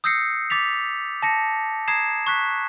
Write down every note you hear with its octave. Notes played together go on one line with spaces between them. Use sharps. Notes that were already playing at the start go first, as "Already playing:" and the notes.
D#6 E6 G6 A#6 C7 C#7
D6 A6 B6 F7
A5 A#6 C#7
A#5 D#6 G#6 C7 E7
C#6 F#6 B6